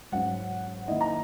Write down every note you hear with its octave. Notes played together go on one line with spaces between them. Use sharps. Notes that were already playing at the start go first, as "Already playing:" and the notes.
G#2 F#3 C#4 F#5
D#3 A#3 E4 D#5
A#5